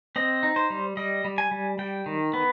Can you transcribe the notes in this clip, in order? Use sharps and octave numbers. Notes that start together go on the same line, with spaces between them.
C4 D#5
D#4
C5
G3
G3 D#5
G3
G#5
G3
G3 G5
D#3
B3